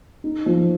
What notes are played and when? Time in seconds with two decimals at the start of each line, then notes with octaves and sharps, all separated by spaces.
0.24 D#4
0.46 F3